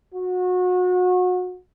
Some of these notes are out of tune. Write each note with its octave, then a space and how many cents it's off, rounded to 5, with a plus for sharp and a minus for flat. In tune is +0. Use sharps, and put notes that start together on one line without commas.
F#4 -30